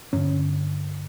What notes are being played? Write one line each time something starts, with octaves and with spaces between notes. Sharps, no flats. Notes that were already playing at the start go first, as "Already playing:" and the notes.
G2 D3 C#4